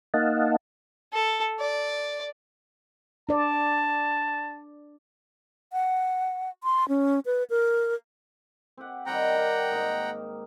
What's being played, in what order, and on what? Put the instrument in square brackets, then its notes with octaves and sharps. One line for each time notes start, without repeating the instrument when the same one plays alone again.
[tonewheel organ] A#3 D#4 D#5 F5 F#5 A5
[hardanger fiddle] A4
D5
[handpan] D4 D5 [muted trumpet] A5
[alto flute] F#5
C6
C#4
B4
A#4
[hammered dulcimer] C4 G4 F#5
[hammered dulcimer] D#3 G3 C4 [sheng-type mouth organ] F#5 G5 A#5
[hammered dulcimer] G4 A#4
G#2 A#3 D#4